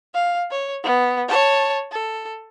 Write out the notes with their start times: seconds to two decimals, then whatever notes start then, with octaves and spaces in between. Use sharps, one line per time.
0.14 F5
0.51 C#5
0.84 B3
1.28 C#5 A5
1.92 A4